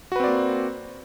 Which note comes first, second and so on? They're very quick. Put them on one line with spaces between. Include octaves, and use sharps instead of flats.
F#4 B4 C4 D5 A#3